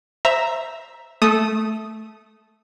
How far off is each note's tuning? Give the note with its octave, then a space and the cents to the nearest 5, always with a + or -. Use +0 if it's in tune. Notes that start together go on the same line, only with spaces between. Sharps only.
C5 +0 E5 +0 A#5 +0
A3 -10 D#6 +0